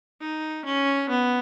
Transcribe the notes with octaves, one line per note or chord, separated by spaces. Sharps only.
D#4
C#4
B3